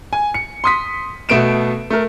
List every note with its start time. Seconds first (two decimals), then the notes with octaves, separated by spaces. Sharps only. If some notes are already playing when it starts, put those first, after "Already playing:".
0.13 G#5
0.34 C#7
0.64 C6 D#6 B6
1.29 B2 A3 B3 D7 E7
1.90 A3 A#4